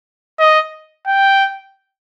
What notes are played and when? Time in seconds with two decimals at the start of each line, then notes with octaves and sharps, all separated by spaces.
0.39 D#5
1.07 G5